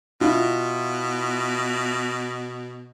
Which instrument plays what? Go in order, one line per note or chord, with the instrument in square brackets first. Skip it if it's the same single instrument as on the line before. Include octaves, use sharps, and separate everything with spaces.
[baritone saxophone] B2 [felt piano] E4 F4